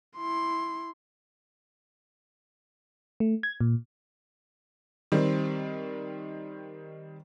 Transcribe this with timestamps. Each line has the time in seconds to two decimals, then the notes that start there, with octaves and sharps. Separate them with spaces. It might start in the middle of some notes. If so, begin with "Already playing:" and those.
0.17 E4 C6
3.20 A3
3.43 G#6
3.61 A#2
5.12 D#3 G3 C4